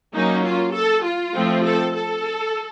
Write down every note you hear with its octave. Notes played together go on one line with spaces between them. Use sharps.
F#3 A#3 C#4 D#4
F4
A4
F4
F3 A3 C4
A4
A4